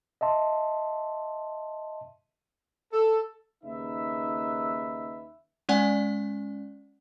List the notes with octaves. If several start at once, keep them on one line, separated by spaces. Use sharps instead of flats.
D#5 E5 A5 C6
A4
D#2 C#3 D#4 B4 E5
G#3 C#4 D5 F#5 G#5